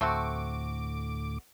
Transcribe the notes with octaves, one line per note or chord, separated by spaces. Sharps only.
D2 A2 A3 C4 F#4 D6